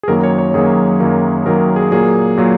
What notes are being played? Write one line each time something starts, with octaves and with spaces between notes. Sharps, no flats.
G#4
F#2 D#3 F#3 A#3 A#4
C#5
C#5
F#2 D#3 F#3 A#3 G#4
F#2 D#3 F#3 A#3
F#2 D#3 F#3 A#3 A#4
G#4
A#2 F#3 A#3 G#4
A#2 F#3 A#3